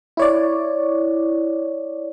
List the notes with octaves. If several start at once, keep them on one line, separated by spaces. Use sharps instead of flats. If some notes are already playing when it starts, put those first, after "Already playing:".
E4 C#5 D5